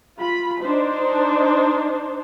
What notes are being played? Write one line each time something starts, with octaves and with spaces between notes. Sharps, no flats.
F4 B5
D4 D#4 C5